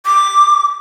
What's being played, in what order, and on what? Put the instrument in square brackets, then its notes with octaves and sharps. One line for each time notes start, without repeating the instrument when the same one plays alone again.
[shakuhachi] D6